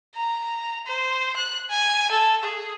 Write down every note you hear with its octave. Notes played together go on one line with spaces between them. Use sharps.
A#5
C5
F#6
G#5
A4
G#4